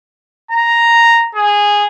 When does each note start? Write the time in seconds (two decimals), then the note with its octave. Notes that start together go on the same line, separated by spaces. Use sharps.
0.51 A#5
1.35 G#4